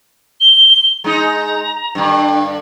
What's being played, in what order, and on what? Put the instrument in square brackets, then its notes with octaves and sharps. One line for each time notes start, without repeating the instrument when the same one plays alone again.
[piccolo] G7
[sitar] G#3 D#4 [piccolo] A#5
[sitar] G2 D3